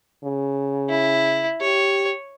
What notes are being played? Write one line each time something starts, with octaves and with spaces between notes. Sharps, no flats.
C#3
E4
G4 C#5